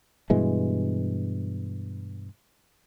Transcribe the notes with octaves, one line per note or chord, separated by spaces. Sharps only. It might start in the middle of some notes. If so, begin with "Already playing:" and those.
G2 B2 E3 G#3